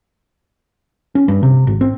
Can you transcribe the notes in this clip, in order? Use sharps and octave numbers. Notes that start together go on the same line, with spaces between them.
C#4
G2
C3
G#1
C4